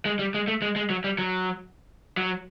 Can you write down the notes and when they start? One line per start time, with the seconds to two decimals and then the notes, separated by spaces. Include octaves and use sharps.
0.05 G#3
0.19 G3
0.34 G#3
0.48 A3
0.62 G#3
0.76 G#3
0.90 F#3
1.04 G3
1.19 F#3
2.17 F#3